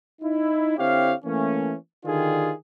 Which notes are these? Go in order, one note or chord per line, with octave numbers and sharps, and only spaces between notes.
D#4 E4
D3 C4 E4 G4 C#5 F5
E3 A3 A#3 C#4
D3 D#3 D4 F4 G4 G#4